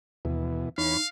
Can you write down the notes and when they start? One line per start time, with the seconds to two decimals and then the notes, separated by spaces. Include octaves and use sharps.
0.25 D#2 B2 E3
0.78 E2 D#4 C#5 F5 B5